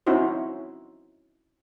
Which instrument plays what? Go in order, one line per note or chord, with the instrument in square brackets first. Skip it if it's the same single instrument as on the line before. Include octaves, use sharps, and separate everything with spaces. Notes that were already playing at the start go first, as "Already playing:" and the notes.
[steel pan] C4 C#4 D#4 E4 F#4 C5